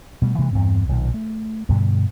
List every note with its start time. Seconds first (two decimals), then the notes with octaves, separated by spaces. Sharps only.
0.22 B2 G3 A3
0.38 C3 E3 G#3 A#3
0.53 E2 G2 C4
0.89 B1 A#2 D#3
1.14 A3
1.69 G2 B2 D3 G3